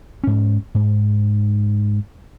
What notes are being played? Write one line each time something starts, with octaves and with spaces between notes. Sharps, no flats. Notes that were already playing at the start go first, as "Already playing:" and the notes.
G#2 C#4
G#2